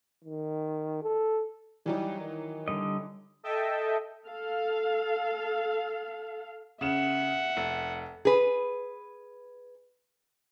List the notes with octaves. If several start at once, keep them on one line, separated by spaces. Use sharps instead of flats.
D#3
A4
E3 F#3 G3 D#4
D#3
D3 G3 D#5
A4 D#5 E5 G5 A5
A4 F5
C#3 E5 F#5 E7
F1
G#4 B4